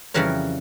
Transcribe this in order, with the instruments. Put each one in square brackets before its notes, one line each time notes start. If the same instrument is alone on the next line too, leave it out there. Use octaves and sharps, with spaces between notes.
[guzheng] F2 C#3 E3 G3 A#4 C#5